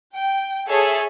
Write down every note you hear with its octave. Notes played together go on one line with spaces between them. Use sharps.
G5
G#4 A4 C#5 E5